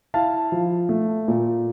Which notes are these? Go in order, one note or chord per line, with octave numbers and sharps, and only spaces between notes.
E4 F5 A5
F3
A3
A#2